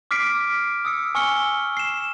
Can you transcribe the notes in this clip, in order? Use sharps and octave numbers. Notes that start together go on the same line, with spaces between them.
D6 F6 B6 C7 D7
D#6 E6 C#7
G#5 C#6 E6 F6 C#7 G7
C7 E7